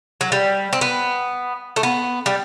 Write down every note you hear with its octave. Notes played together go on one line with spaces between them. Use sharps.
F#3
G3
C4
B3
A3
B3
G3